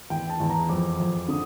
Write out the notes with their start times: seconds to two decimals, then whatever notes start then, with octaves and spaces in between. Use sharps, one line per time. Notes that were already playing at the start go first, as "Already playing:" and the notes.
0.10 E2 G5
0.30 A5
0.40 E2
0.50 A#5
0.69 F2 D6
1.00 F2
1.28 D3 D#6